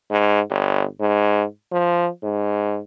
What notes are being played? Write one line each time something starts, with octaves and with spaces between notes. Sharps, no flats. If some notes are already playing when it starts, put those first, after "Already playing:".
G#2
G1
G#2
F3
G#2